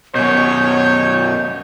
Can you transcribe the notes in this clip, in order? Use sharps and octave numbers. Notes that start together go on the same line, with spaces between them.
F#2 B2 C#5 G6